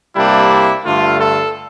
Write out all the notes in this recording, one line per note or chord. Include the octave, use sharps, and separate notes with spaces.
C3 G3 A#3 D4 E4
G2 D3 A3 F4
A4